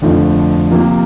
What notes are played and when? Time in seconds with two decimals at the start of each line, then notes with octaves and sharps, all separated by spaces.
0.02 F2 D3 F3 A3
0.71 C3 F3 A#3